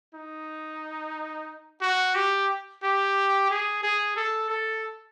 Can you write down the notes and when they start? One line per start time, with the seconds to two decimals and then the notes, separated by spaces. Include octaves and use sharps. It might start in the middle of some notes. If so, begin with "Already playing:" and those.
0.14 D#4
1.81 F#4
2.15 G4
2.83 G4
3.50 G#4
3.83 G#4
4.16 A4
4.50 A4